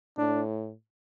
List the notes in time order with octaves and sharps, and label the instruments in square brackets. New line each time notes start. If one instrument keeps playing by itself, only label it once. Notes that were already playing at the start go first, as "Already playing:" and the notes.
[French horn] A2 [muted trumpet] D4